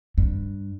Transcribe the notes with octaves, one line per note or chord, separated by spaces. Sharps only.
G2